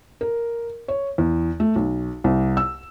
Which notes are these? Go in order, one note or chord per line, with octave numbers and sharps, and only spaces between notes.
A#4
C#5
E2
A3
B1
C2
E6